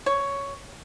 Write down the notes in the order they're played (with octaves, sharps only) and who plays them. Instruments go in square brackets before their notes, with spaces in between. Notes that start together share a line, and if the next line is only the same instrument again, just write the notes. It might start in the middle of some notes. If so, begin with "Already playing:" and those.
[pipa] C#5